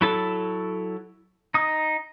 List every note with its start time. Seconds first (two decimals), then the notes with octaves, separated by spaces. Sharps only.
0.01 F#3 E4 A4
1.54 D#4 D#6